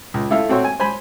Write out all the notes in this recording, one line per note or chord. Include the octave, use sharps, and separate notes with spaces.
C#2
A3 E4 A4 F5
A3 C4 F#4 C#5
G#5
C5 G#5 B5